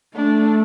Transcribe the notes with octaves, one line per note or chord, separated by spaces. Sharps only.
A3 D4